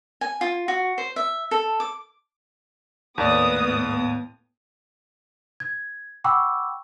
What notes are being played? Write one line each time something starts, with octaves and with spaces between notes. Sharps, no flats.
G#5
F4
F#4
C5
E5
A4
D6
D#2 A2 B3 D5 D#6
G#6
F#5 G5 B5 C#6 D6 E6